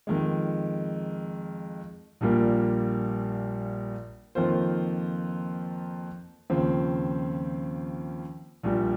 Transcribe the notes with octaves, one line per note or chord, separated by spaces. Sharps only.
F2 D#3 G#3
A#1 A#2 G3 A#3
F2 D#3 A#3 F4 C5
D#2 C#3 F3 C4
A#1 A#2 G3